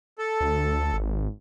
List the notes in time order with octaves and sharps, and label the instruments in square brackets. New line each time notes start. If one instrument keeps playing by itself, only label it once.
[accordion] A4
[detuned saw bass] D2
G#1